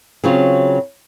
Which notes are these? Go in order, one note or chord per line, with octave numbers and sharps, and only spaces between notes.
C#3 F#3 C4 F4